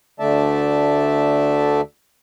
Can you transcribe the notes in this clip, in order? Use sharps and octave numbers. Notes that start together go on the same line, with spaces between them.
D2 D3 A3 D5 E5 A5